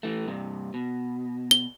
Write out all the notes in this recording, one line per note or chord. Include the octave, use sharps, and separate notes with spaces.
E3 A3
G2 C3
B2
G7